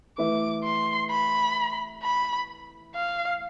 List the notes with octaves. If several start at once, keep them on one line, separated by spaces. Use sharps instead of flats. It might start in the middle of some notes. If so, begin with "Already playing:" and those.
E3 A3 E4 B4 E5 D6
C6
B5
B5
F5